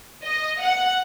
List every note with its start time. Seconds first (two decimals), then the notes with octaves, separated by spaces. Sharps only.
0.24 D#5
0.61 F#5